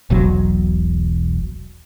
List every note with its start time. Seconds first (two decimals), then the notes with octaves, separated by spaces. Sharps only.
0.10 E1 B1 F#3